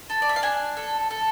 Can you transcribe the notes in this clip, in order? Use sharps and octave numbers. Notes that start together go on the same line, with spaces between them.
A4
D5
E5
F5
D4 G#5
A4
A4